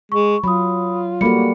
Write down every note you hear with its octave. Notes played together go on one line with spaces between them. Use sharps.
G#3 C#6
F#3 F4 B5 D#6
G3 A#3 F#4 A4 B5 C#7